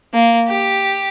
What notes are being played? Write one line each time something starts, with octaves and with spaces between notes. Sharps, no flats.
A#3
G4